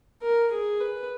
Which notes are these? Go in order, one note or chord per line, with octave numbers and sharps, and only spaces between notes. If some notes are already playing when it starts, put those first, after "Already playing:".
A#4
G#4
B4